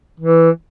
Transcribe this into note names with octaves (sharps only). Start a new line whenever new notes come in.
E3